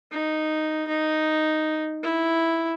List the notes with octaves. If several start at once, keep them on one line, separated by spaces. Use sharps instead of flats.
D#4
D#4
E4